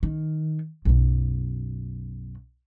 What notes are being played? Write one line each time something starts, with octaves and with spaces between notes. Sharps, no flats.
D#3
B1 F#2